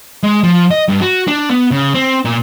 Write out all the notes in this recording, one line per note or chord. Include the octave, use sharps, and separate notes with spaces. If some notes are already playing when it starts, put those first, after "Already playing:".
G#3
F3
D#5
G2
F#4
D4
B3
C#3
C4
A#2